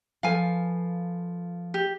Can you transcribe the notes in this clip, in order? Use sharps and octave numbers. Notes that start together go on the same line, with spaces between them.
F3 A4 B4 F5 G#5
G4